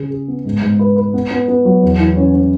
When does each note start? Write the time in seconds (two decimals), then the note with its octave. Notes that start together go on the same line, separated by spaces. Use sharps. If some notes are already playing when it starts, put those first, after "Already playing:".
Already playing: C#3 G#4
0.10 G#4
0.28 B3
0.45 G#2
0.62 G#2
0.79 B4
0.96 B4
1.14 B3
1.31 B3
1.48 B3
1.65 F#3
1.83 E2
1.99 E3
2.17 C#4
2.34 C#4